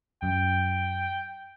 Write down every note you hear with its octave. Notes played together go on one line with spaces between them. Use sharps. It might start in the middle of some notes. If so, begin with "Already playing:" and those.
F#2 G5